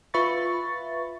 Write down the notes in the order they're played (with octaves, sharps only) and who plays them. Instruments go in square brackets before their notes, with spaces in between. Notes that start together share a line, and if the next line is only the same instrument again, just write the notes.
[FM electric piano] F4 B4 E5 B5 C#6 A6